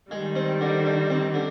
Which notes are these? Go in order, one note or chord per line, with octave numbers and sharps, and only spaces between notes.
D#3 G3 G#3
C4
D3
D3
C4
D3